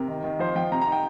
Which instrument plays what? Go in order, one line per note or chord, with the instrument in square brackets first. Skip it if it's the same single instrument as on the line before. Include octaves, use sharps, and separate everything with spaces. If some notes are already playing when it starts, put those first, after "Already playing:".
Already playing: [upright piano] C3 A#4
D#3
D#3
F3 C5
F3 G5
C3 A#5
A#5
D#4
G5